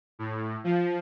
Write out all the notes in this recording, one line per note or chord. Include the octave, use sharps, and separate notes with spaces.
A2
F3